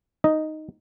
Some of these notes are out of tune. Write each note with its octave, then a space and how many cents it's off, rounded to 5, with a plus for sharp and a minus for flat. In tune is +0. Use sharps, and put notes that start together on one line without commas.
D#4 +0 D#5 +0